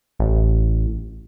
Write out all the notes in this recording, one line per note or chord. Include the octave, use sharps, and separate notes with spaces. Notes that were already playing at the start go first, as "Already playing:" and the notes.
A1